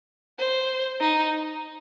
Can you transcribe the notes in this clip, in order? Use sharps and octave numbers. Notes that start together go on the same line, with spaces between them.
C5
D#4